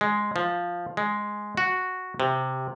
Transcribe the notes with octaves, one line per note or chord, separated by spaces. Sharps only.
G#3
F3
G#3
F#4
C3